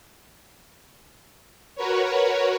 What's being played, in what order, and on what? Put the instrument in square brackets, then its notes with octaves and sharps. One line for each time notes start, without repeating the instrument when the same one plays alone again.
[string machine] F#4 A#4 B4 C#5